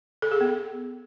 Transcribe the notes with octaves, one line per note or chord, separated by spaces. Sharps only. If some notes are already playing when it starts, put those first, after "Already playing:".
A4
G#4
B3